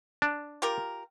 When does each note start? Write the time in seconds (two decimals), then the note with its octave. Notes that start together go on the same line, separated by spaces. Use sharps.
0.22 D4
0.62 F4 G4 A#4